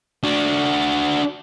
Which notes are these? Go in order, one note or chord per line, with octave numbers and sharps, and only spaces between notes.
D4 F#4